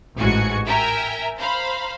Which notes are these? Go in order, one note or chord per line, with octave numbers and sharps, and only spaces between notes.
A1 G#2 F#4 G#5 C#7
A#4 E5 G5 G#5 A#5
C5 F5 A#5 B5